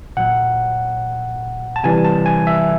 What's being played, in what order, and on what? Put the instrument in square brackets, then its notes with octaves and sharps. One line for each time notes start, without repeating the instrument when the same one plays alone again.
[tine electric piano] A#2 F#3 F#5
A5
C3 E3 G3 G#5
A5
G#5
E5